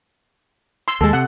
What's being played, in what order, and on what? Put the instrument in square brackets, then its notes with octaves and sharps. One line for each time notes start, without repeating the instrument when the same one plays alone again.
[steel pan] C6 E6
[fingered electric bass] D#2 G#3 [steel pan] A4
[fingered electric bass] C3 [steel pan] F#5